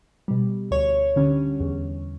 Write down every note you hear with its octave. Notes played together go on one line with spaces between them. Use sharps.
B2 G3
D2 C#5
D3 G3 C#4
E2